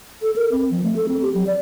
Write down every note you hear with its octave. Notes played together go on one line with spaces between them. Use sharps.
A4
A#4
C4
F3
A3
A4
C4
G4
F#3
D5